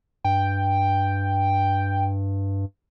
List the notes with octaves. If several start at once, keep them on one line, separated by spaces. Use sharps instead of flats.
G2 G5